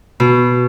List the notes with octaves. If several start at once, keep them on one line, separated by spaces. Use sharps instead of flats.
B2